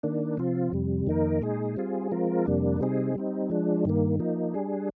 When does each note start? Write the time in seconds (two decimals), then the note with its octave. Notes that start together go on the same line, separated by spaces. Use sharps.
0.03 D#3 A#3 D4
0.37 C3 F3 C4 F4
0.72 F2 C3 G3
1.07 F2 D#3 A#3 D#4 A#4
1.42 A#2 G#3 D#4 G#4
1.77 G3 C4 F4 G#4
2.11 F3 G#3 C4 F4 A#4
2.46 F2 C3 G3 A#3 D4
2.81 C3 G3 C4 D#4 G#4
3.15 G3 C4 D#4
3.50 F3 G#3 D4
3.85 G2 D#3 A#3
4.20 F3 A#3 D#4
4.54 G3 D4 G#4